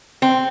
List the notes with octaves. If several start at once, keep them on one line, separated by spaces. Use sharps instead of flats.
C4